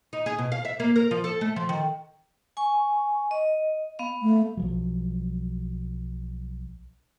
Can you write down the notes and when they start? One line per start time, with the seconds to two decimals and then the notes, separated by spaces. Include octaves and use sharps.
0.13 D#4
0.26 G#4
0.38 B2
0.52 F5
0.65 E5
0.80 A#3
0.96 A#4
1.11 F3
1.24 A4
1.41 A3
1.56 F3
1.69 D#3
2.57 G#5 C#6
3.31 D#5
3.99 B3 F5
4.22 A3
4.57 B1 F3 F#3